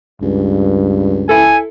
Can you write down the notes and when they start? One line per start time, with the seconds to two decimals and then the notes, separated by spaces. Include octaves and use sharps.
0.22 C#2 G2
1.29 E4 A4 G#5